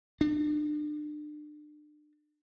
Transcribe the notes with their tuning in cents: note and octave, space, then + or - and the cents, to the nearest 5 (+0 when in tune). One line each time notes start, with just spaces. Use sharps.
D4 +35